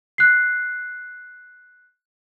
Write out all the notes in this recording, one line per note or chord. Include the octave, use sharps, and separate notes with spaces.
F#6 C7